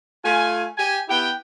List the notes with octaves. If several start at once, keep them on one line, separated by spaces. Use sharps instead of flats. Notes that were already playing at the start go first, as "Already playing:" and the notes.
A3 F4 G#5
G4 G#5
B3 E4 G4 G5